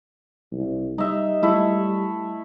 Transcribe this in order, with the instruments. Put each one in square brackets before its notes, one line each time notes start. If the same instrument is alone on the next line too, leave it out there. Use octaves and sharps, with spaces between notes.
[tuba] C2
[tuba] G3 [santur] D#4 E5
[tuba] G3 [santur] A3 E4 E5